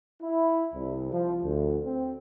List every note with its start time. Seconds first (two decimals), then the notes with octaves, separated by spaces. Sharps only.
0.21 E4
0.73 C2
1.12 F3
1.43 D2
1.85 C4